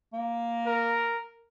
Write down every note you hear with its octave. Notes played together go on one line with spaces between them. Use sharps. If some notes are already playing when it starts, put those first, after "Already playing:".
A#3
A#4